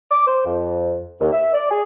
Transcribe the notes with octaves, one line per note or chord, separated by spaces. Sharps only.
D6
C5
F2
D#2
E5
D5
G#4